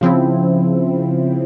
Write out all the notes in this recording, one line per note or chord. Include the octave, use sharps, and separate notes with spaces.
C#3 F3 C4 E4